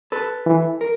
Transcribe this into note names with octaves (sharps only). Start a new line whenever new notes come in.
A4 B4
E3
A#4